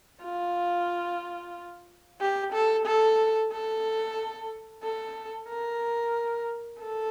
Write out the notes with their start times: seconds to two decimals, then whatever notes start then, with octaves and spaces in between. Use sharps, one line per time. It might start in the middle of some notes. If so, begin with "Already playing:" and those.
0.23 F4
2.21 G4
2.53 A4
2.86 A4
3.52 A4
4.83 A4
5.50 A#4
6.81 A4